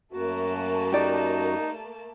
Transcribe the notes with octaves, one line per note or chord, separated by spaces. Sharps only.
F#2 A3 A#3 F#4 A5
D#4 G4 D5